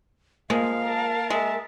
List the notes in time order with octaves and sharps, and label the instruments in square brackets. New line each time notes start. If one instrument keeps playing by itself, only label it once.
[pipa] F3 G#3 [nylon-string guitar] A#3 [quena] F5
[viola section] A#4 A5
[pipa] G#3 [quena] E5